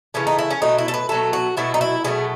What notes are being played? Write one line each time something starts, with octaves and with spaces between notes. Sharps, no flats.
C#3 E3 A3 C#4
D#4
E4
C#4
B2 F#3 A3 D#4
E4
A4
B4
B2 F#3 A3 A4
F#4
B2 F#3 A3 E4
D#4
E4
B2 F#3 A3 G#4